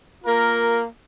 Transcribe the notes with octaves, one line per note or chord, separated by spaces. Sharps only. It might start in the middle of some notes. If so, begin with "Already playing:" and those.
A#3 F4 A#4